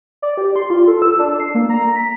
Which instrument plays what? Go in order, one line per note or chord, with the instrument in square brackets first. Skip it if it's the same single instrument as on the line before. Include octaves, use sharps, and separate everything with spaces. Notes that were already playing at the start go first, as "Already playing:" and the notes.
[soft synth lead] D5
G4
C6
F4
A4
E6
D4
C7
A#3
A#5
B6